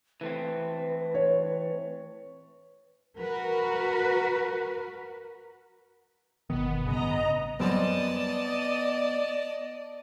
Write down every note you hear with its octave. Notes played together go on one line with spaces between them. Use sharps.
E3 A3 C4 B4
C#5
F#4 A#4 B4
G1 B2 D#3 B3
A1 G2 C#3 D#5 A#5
F#2 G3 B3 C4 D5 D#5 A5